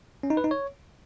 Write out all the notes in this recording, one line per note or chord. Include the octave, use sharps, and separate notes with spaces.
C#4
D#4
B4
D#4
C#5